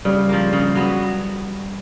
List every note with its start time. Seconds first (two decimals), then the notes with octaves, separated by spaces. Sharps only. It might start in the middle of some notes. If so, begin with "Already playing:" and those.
0.05 C#3 G3
0.29 F3 A#3
0.53 C#3
0.75 F#3 B3